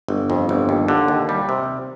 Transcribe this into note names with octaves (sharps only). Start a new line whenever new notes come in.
G1
F2
G1
D#2
D3
D#2
G3
C3